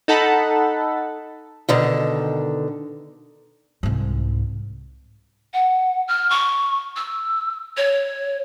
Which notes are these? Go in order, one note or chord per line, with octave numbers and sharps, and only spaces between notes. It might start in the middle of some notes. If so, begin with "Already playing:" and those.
D#4 A4 F#5 A5 B5
B2 D3 D#3
C2 G#2
F#5
F6
C#6
E6
C#5